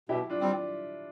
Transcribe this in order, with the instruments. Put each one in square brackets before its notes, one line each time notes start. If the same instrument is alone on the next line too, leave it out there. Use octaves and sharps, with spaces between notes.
[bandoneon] B2 [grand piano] E4 G4
[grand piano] D4 F4
[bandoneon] G3 C4